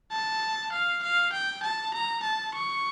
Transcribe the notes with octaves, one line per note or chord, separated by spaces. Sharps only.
A5
F5
F5
G5
A5
A#5
A5
C#6